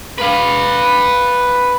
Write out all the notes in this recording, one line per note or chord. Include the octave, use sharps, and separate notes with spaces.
B4 F5